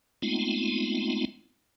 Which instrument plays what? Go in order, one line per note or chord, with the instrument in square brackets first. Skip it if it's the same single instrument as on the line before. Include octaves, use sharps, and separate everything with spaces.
[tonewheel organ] G#3 A3 B3 C4 D#4 F4